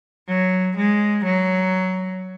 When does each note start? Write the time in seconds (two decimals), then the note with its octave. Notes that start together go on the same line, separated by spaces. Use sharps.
0.29 F#3
0.77 G#3
1.25 F#3